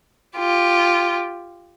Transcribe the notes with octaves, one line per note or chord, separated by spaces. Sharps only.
F4 G4